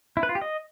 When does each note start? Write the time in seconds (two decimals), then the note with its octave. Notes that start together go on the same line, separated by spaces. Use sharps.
0.17 E4
0.23 B4
0.29 F4
0.35 G4
0.41 D#5